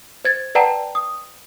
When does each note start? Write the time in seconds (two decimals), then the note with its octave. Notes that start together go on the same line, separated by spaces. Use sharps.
0.25 C5 G#6 A6
0.55 B4 D5 F#5 G5 A5 A#5
0.95 D#6